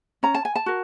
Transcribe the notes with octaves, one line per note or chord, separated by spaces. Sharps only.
C#4 A#5
A5
G#5
A5
F#4 A#4